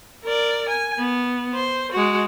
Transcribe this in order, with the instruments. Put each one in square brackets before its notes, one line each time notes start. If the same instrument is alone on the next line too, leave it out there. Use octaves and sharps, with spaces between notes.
[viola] A#4 D5
G#5
B3
C5
G#3 F#4